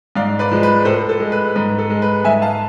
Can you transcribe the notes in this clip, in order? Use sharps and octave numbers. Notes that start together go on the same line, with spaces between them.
G#2 D5 F5
B4 D5
F3 G#3
B4
A2 A4 C5
A4
G#3
B4
G#2 B4
A4
G#3
B4
G#2 E5 G#5
F5 A5